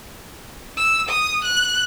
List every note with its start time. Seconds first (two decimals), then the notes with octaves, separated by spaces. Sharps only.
0.77 E6
1.09 D#6
1.44 F#6